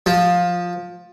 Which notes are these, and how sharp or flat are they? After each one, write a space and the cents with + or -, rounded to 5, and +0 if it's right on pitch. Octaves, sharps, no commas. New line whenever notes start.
F3 +15